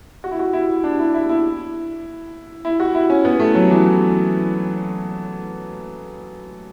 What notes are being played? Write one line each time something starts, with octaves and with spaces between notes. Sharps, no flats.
F#4
E4
F#4
E4
D4
E4
E4
E4
E4
F#4
E4
C#4
B3
A3
F#3
E3